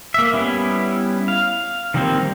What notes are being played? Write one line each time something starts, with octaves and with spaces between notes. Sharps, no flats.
A#3 E5
G3 B3 C#4 E4
F5
D#3 F3 G3 A#3 C4